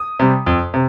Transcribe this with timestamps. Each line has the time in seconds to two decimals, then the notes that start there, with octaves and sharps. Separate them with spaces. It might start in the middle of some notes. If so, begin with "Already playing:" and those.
Already playing: D#6
0.19 C3 G3
0.46 F2
0.74 C3